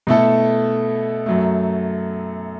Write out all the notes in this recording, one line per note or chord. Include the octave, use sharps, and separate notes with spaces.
B2 A3 E4 A4
F#2 F#3 A3